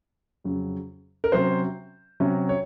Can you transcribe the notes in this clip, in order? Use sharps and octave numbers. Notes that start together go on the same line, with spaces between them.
F2 C#3 F#3
A#4
C3 F#3 C#4 C5
C3 F#3 C#4
C#5